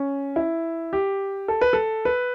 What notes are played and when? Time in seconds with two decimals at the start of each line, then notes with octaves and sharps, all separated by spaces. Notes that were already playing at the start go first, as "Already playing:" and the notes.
Already playing: C#4
0.36 E4
0.93 G4
1.48 A4
1.61 B4
1.73 A4
2.05 B4